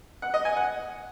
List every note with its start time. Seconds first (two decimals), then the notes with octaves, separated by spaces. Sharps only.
0.22 F#5
0.34 D#5
0.45 G#5
0.57 F#5